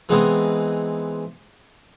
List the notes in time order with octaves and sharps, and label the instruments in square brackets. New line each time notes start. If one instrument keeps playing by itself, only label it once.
[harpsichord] E3 G#3 B3 C4 D#4 E4